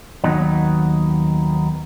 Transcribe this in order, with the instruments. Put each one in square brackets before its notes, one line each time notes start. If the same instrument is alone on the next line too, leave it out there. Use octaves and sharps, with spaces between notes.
[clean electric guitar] D#2 D#3 F#3 B3 D#4